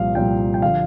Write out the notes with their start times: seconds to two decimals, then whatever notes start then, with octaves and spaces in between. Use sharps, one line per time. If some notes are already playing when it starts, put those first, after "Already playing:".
Already playing: C2 A#2 F3 F5
0.15 C2 A#2 F3 G5
0.54 G5
0.62 D3 F3 F5